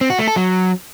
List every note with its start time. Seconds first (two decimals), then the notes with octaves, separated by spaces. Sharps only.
0.01 C4
0.10 F#4
0.19 A3
0.28 A4
0.36 F#3